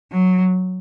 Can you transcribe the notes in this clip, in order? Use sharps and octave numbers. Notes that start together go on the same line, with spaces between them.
F#3